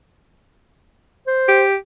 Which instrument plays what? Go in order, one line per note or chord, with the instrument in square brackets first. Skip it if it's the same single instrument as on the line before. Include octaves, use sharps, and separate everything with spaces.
[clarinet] C5
[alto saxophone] G4